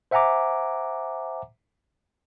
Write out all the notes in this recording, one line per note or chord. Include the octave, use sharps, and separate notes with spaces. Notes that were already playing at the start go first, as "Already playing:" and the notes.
C5 E5 F#5 G#5 A#5 D6